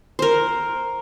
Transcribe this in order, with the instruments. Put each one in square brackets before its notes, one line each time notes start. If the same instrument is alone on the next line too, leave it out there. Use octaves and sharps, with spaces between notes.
[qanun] A#4 C5